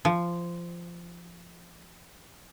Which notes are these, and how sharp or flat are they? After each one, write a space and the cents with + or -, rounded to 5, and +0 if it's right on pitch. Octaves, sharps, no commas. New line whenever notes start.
F3 -15